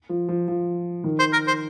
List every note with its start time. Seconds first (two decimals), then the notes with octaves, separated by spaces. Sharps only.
0.09 F3
0.28 F3
0.48 F3
1.04 D#3
1.19 C5
1.33 A#4
1.47 C5